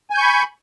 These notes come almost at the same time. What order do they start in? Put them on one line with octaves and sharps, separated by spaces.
G#5 G6 C#6 B5